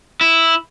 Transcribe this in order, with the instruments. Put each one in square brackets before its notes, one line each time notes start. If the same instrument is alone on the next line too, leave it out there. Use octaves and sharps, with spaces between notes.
[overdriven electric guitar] E4